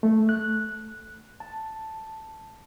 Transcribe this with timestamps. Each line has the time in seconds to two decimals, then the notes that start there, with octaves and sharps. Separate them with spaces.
0.03 A3
0.29 F#6
1.40 A5